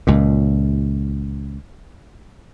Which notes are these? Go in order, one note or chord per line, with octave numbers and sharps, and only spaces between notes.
C#2 A#2